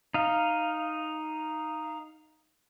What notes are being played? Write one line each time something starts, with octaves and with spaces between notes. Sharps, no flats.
D#4 F5